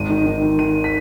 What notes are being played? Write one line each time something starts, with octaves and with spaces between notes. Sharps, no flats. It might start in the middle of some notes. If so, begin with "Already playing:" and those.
Already playing: G#1 D#7
D#3
D#3
D#3
D#3 D#7
B6